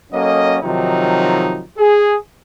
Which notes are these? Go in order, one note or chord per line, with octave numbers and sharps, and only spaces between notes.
F#3 A#3 C#4 A4 D#5
C3 D#3 F3 F#3 C4 D#4
G#4